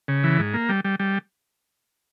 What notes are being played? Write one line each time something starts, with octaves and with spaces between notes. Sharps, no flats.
C#3
E3
G#2
A#3
G3
G3
G3